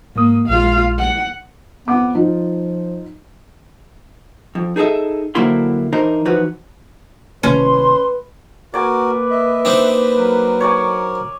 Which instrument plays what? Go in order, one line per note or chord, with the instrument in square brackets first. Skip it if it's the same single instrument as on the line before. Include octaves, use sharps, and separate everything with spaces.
[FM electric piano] G#2 D#6 [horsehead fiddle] A#3
[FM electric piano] A#1 G#3 [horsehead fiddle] F4 F5
[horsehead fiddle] F#5
[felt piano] F2 F#5 D6 [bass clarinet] B3
[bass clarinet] F3 [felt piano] D#4 F4
[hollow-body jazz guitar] F2
D#4 G#4 A4 D#5 E5
D3 F#3 A#3 C4 E4 C6
E3 D4 D#4 A#4 C5 D#5
E3 F3 D#4 F#4 B4
[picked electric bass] G1 C3 D#3 [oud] C#4 [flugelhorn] B4 [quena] C6
[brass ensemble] A#3 B4 [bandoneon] F#4 A#4 [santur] D5 G#5
[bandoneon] D#5 E5
[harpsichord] C4 D4 D#4
[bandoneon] F#3 A#4
[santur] C#5 D5 G#5